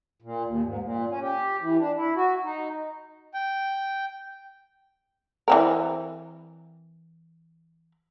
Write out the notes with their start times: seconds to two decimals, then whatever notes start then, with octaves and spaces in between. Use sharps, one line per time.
0.22 A#2
0.45 D#2
0.63 G#2
0.82 A#2
1.09 C#4
1.21 G4
1.60 E3
1.78 D4
1.97 E4
2.15 F#4
2.44 D#4
3.34 G5
5.48 E3 C4 A#4